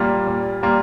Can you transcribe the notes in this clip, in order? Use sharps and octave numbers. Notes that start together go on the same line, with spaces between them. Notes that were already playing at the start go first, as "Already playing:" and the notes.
Already playing: A#2 G3 A#3 F4
A#2
G3 A#3 F4